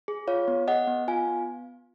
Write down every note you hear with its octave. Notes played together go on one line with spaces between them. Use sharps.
G#4
F4 C#5 F5
B3
G#4 D#5 F#5
B3
F4 F5 G#5
B3